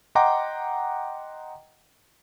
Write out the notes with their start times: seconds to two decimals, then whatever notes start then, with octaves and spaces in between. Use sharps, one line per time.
0.15 D#5 F#5 G5 A#5 C6 D6